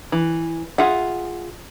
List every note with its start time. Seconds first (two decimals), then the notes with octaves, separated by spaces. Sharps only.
0.12 E3
0.78 F4 G#4 E5 F#5